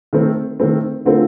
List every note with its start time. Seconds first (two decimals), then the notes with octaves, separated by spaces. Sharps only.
0.13 D#3 A3 C4
0.60 D#3 A3 C4
1.05 D3 A3 C4 F4 A#4